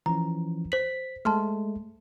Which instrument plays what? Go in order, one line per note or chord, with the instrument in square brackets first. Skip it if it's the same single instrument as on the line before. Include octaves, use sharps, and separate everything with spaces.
[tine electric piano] E3 F3 C#4 [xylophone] A#5
[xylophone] C5 F#7 [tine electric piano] B6
[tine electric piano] G#3 A3 [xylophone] A5 C6 F6